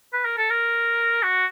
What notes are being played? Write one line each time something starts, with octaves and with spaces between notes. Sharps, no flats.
B4
A#4
A4
A#4
F#4